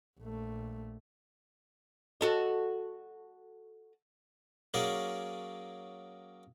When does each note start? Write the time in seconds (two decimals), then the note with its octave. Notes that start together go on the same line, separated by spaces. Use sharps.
0.19 A#1 A3
2.21 F#4 A4 D#5
4.74 F#3 A#3 C#4 G#4 A#4 D5